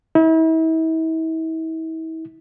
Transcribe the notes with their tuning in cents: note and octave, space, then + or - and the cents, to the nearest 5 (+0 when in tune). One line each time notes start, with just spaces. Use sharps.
E4 -40